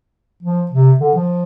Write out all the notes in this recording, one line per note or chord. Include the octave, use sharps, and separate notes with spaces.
F3
C3
D3
F3